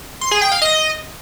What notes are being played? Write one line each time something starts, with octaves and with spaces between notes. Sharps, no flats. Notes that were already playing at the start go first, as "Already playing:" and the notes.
C6
G#4
G5
F5
D#5